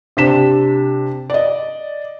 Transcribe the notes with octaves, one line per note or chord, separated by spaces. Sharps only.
C3 D4 B6 E7
D5 D#5